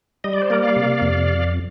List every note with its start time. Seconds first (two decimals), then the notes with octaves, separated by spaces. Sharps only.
0.24 G3 D#5
0.33 D5
0.42 C5
0.50 A#3 A#4 D5
0.62 D5 F5
0.76 C3
1.01 F2